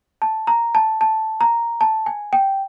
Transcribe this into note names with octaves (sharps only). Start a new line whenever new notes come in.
A5
A#5
A5
A5
A#5
A5
G#5
G5